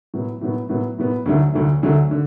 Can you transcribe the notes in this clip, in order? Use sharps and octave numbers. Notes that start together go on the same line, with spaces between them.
A2 F#3 B3
A2 F#3 B3
A2 F#3 B3
A2 F#3 B3
D2 D3 F#3 A3
D2 D3 F#3 A3
D2 D3 F#3 A3
D3